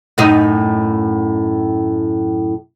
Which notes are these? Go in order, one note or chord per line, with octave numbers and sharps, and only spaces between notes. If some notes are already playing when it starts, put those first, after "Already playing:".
F#2 A2 D#4